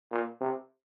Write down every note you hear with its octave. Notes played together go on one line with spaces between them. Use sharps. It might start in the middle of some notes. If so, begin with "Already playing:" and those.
A#2
C3